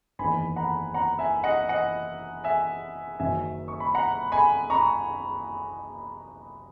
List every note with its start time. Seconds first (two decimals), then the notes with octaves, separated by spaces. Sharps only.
0.19 F#1 E2 D#3 G#5 B5
0.56 F#5 A#5
0.94 F#5 A#5
1.19 E5 G#5
1.44 D#5 F#5
1.69 D#5 F#5
2.44 E5 G#5
3.19 F#1 F#2 D#3 F#3 E5 G#5
3.68 C#6
3.80 B5
3.94 F#5 A#5
4.32 G#5 B5
4.70 A#5 C#6